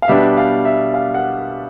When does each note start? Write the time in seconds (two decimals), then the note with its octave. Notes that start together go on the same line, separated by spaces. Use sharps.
0.02 F5
0.08 B2 G3 B3 D4 E5
0.37 F5
0.65 E5
0.94 F5
1.14 F#5